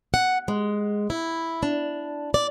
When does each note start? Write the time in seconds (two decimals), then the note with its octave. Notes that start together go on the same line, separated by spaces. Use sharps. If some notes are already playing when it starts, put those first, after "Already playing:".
0.14 F#5
0.48 G#3
1.10 E4
1.63 D4
2.34 D5